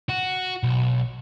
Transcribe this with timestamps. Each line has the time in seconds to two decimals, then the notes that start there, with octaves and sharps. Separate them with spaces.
0.09 F#4
0.63 B1